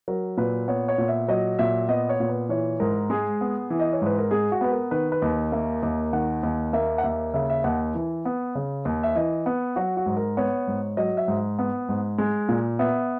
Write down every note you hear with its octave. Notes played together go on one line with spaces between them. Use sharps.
F#3 A#4
A#2 B4
B3 C#5
C#5
A#2
E5
F#3 D#5
A#2 E5
B3 D#5
C#5
A#2
B4
E3 C#5
G#2 A#4
G#3 G#4
B3
E3
D#5
C#5
G#2 B4
A#4
G#3 G#4
F#4
B3 B4
A#4
D#3 B4
B4
D#2
A#3 E5
D#2
D#3 F#5
D#2
A#3 E5
F#5
D#2 E5
C#3 E5
E5
D#2 F#5
E3
B3
C#3
D#2
E5
E3 D#5
B3
F#3 F#4
F#4
G#2
A#4
B3 C#5
G#2
F#3 D#5
E5
G#2
B3
G#2
G#3
A#2
B3 E5